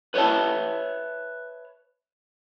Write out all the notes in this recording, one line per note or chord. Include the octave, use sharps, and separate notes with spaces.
B4 C#5 D#5 E5 A5